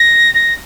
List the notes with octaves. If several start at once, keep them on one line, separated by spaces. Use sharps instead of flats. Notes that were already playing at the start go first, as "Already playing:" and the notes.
Already playing: A#6
A#6